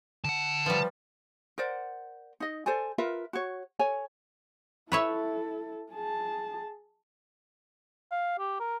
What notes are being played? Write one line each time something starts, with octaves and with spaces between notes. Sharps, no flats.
D3 F#5 A5
F3 G3 B4
A#4 C5 D5 F#5
D#4 D#5
A4 C5 D5 G#5
F4 A#4 B4 E5
F#4 C#5
A4 C#5 G#5
E4 A4 B4 C#5 E5
G#4 A5
F5
G4
A#4